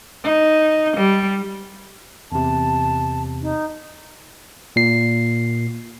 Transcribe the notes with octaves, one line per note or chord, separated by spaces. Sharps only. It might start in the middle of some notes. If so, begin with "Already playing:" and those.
D#4
G3
E2 C3 A5
D#4
A#2 C7